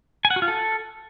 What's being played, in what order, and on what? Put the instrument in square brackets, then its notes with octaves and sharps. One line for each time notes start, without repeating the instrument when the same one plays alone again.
[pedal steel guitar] G#5
F#5
F#4
F4
A4